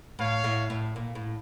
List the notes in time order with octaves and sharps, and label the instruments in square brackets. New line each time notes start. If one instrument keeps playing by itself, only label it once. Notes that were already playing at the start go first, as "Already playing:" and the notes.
[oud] A2 [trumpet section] C#5 F5
[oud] A2
A2
A#2
A2